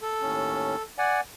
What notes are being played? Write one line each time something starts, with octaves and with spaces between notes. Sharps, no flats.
A4
D#2 A2 C#4
D5 F#5 G#5